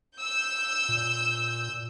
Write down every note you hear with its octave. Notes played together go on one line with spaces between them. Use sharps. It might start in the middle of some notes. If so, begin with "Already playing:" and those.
E6 G6
A#2